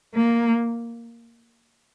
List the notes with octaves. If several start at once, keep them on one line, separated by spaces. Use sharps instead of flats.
A#3